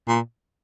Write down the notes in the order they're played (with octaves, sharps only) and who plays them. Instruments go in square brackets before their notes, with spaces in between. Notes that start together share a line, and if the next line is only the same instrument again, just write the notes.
[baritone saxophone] A#2